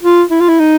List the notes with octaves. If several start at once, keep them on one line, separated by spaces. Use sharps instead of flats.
F4
E4
F4
E4
D#4